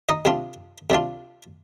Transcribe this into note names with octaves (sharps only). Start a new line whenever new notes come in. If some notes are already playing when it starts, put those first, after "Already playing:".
D#4 D#5
C3 G3 D4 F4
C3 G3 D4 F4